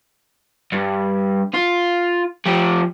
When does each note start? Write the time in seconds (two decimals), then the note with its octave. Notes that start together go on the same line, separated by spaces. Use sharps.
0.72 G2
1.54 F4
2.46 F3 G4